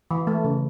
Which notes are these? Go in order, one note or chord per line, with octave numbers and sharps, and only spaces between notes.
E3
A3
C#3